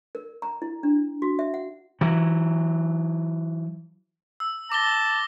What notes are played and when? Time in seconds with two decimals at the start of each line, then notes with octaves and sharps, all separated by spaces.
0.15 A#4
0.42 A#5
0.62 E4
0.83 D4
1.22 F#4
1.39 E5
1.54 F#5
2.01 E3 F#3
4.40 E6
4.72 A5 D6 A#6 G7